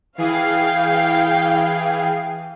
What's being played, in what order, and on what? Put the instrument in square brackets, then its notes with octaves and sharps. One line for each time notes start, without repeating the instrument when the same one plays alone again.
[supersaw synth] E3 G#4 [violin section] F5 G5